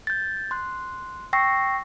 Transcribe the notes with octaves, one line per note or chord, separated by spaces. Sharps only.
G6 A6
C6 F#6
G5 C#6 E6 A#6 C7